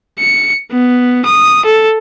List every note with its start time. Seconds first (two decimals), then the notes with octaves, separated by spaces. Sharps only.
0.19 C#7
0.71 B3
1.25 D#6
1.65 A4